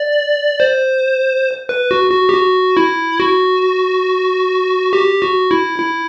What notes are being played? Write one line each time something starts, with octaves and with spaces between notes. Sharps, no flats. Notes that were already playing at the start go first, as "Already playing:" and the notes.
Already playing: D5
C5
B4
F#4
F#4
G4
F#4
E4
F#4
G4
F#4
E4
E4